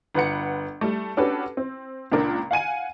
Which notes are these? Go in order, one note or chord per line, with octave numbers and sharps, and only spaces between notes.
G1 B4 F#5 C#7
G3 A3
C#4 D4 F#4 G4 A4 B4
C4
C#2 A#2 D4 A#4
F5 F#5 G#5 D#7